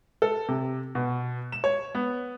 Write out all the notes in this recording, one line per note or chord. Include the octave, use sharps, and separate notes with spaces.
A4
C3
B2
E7
C#5
B3